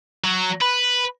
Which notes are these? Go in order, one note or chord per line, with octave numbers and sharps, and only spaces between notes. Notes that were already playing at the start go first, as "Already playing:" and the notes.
F#3
B4